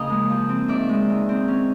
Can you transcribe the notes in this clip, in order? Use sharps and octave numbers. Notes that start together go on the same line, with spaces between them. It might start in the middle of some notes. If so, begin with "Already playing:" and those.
Already playing: C#3 F3 A#3 D#5 F5
G#3
F3
C4
D#3 D5 E5
G#3
D#3
C4
C#4